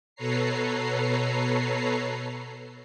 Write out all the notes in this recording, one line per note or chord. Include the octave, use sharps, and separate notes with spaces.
B2 A4 B4 C#5 A#5 C7